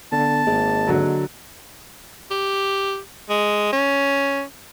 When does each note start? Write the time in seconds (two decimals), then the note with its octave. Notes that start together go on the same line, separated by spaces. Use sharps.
0.12 D3 B3 A5
0.47 G#1 A#3 G#4 D#5
0.88 D3 F#3
2.31 G4
3.29 G#3
3.73 C#4